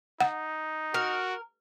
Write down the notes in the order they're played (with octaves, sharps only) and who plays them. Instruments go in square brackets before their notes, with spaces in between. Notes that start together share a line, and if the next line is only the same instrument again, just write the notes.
[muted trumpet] D#4 [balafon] F#5
[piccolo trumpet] F#4 [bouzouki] A#4